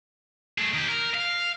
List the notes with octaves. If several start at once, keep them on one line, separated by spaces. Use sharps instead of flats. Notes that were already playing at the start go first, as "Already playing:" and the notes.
A3 G#4
D#3 G4
A#4
F5